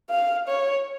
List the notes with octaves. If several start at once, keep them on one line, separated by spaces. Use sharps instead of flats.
F5
C#5